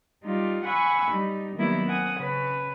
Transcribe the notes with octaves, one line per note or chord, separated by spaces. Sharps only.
G3 D#4 F4
F#5 G#5 B5 C#6 E6
G3 D#4
D#3 F#3 G3 A#3 B3 E4
C4 F#5 G#5 D#6
C#3 B4 C#5